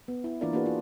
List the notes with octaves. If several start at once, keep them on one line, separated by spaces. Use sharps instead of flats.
B3
E4
E3 A#3 D4 F4 A#4 D5
A#3 D4 F#4 G#4 B4
F4